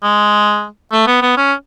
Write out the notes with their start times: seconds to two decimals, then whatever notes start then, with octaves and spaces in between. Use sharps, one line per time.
0.04 G#3
0.93 A3
1.07 B3
1.22 B3
1.37 C#4